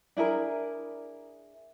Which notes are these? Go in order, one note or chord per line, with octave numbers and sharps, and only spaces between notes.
D4 E4 G#4 A#4